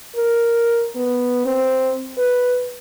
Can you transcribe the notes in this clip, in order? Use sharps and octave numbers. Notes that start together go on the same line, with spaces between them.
A#4
B3
C4
B4